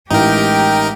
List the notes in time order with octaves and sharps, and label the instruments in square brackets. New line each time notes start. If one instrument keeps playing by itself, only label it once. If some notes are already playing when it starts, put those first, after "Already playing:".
[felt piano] A1 [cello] G#3 G4 [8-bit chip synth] D#4 A#4 [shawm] G5